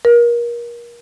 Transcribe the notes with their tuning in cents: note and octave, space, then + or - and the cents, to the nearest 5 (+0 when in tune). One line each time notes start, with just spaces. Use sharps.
A#4 +30